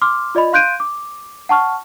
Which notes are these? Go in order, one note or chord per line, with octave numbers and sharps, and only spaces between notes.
C6 D6 F6
F4 D5 D#5 B5
F5 C6 F#6 G6 D7 D#7
D6
F#5 A5 C#6 F6